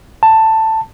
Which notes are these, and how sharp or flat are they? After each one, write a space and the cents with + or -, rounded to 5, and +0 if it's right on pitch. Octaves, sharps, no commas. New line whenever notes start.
A5 +10